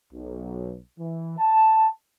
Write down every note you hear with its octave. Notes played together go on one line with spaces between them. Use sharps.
B1
E3
A5